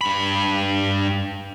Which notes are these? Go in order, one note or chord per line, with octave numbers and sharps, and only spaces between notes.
G2 B5